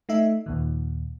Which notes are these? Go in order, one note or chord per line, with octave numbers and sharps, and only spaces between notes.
A3 D#4 E5
D#2 A#2 D#3